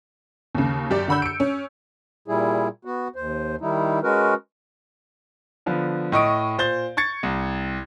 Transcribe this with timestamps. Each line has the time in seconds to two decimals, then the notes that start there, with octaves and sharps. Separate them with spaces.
0.55 D#2 C#3
0.90 F#2 G4 D5
1.08 D3 F#5 B5 E6 G6
1.22 C#7 D7
1.40 C#4
2.28 A#2 G3 E4 G#4
2.85 B3 F#4
3.16 D#2 C5
3.61 D#3 G3 D#4 E4
4.03 G#3 C#4 F#4 A#4 B4
5.66 D3 F3 B3
6.12 A2 D#5 C#6 D#6 D7
6.58 A#2 C5 G6 A6 G7
6.97 C#6 G#6 A6 C#7
7.23 C2